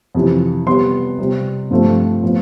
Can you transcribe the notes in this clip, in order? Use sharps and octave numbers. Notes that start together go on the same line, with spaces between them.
F2 C3 E3
C3 G3 B3 C6
C3 G3 C4
G2 F3 A3 C4
A2 F3 B3